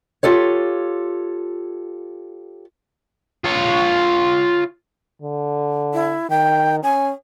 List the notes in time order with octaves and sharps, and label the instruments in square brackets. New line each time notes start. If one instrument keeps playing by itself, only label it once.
[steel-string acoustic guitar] F4 G4 A4 C#5
[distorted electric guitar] F4 C#5
[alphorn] D3
[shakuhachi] E4
[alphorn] D#3 [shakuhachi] G5
[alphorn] C#4 [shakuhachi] G#5